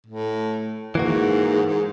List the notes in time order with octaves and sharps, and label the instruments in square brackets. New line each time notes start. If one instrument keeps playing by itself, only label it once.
[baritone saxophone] A2
[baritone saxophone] G#2 [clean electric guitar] E3 A#3 F#4
[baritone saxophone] G#2